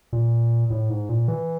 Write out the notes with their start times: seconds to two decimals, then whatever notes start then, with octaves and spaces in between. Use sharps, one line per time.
0.13 A#2
0.70 A2
0.90 G#2
1.09 A#2
1.28 E3